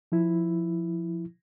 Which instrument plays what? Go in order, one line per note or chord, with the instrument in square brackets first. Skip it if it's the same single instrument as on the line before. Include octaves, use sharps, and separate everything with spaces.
[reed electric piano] F3 E4